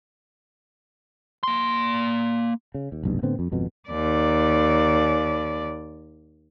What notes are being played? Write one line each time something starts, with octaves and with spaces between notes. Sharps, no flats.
A#3 C6
C#3
D#2
F1 B1 G2
A2 D3 B3 C4
F2
G#1 F2 B2
D#2 D5